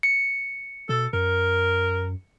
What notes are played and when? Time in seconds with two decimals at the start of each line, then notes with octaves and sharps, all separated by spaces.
0.03 C#7
0.89 B2 A4
1.13 F#2 A#4